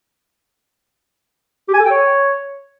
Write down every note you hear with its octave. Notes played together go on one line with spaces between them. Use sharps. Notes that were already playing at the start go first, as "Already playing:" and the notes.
G4
G#5
A4
G5
C#5